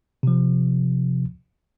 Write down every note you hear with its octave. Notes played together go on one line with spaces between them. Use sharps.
C3 F3